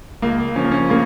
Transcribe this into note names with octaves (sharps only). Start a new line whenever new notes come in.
C#2 A#3
F3 C#4
A#3
C#4
C#3 A#3